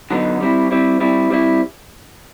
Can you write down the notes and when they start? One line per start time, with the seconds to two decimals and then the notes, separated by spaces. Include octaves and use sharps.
0.10 D3 F#3 B3 D#4
0.40 G3 C4 E4
0.71 G3 C4 E4
1.00 G3 C4 E4
1.30 G3 C4 E4